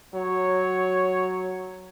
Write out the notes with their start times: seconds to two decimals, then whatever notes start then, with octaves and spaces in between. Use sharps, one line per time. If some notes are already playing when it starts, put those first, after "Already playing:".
0.14 F#3 C#5